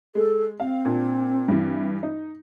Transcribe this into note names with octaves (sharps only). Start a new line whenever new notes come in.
G#3 A4
C4 F5
A#2 D4
G2 E3
D#4